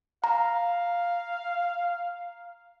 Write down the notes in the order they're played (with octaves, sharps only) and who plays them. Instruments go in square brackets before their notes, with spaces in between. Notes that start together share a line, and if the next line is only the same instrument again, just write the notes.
[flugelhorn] F5 [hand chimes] A#5